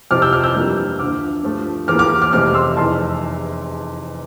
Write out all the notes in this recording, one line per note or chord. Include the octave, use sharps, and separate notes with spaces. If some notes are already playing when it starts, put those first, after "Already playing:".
F2 C3 F3 C4 D6 F6
E6 G6
D6 F6
E6 G6
G2 E3 G3 A#3
D2 D3 F3 D6 F6
G2 F3 A3
E2 E3 A#3 D6 F6
D6 F6
D6 F6
F2 C3 E3 A3 C4 D6 F6
C6 E6
F1 E2 E3 A5 C6